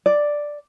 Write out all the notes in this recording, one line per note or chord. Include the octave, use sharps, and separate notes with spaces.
D5